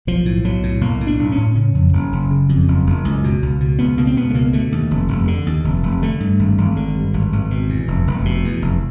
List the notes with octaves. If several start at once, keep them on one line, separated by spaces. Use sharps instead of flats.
B1 F3
A2
B1 F#3
A2
B1 A#3
A2
D4
B1
C#4
A2
C#3 C#4
F2
F#1
F#1
C#3
F2
F#1
F#1
C#2
B2
C#2
B2
C#2 B3
B2 A#3
C4
C#2 B3
A3
B2 A#3
D3 A3
D#2
F1
F1
D3
D#2
F1
F1
D3 A3
G2
G#1
G#1
D3
G2
G#1
G#1
B2
E2
F1
F1
B2
E2
F1